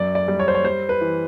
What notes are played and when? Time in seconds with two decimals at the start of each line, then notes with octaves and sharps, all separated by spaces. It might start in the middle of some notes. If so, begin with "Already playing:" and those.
Already playing: F#2 D5
0.15 D5
0.28 G3
0.39 C#5
0.48 C5
0.55 C#5
0.64 G3 C5
0.89 B4
1.01 E3